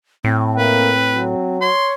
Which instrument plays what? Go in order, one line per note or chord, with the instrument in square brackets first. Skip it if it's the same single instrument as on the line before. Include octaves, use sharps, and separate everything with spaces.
[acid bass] A2 [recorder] C4
[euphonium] A#3 [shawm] B4
[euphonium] F#3
[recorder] C#5 [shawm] C6